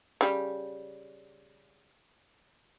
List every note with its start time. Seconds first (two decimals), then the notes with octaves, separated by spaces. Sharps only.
0.21 C#3 G3